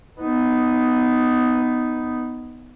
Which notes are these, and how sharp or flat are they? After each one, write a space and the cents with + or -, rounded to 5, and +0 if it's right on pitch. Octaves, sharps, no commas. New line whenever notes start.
B3 +10 D#4 +0